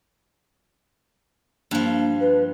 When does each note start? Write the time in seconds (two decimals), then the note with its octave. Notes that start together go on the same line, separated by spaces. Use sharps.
1.71 G2 F3 A#3
2.21 B4